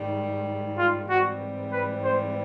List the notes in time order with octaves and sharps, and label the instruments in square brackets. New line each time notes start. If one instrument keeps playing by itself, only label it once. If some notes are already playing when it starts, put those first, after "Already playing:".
Already playing: [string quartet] G#2 D#3 G3
[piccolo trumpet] F4
[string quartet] G#2 E3 G3 C4 [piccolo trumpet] F#4
[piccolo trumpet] B4
C5